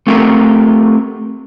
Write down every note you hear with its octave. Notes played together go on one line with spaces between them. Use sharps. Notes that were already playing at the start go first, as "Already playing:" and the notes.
A3 C4 F4 G4 A4 A#4